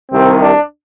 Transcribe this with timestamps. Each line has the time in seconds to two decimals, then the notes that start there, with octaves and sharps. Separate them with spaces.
0.12 C2 C3 D#3 C4
0.40 D4